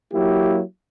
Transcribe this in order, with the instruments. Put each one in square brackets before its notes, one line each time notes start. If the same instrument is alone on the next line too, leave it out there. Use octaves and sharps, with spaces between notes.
[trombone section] F#3 A#3 E4 G4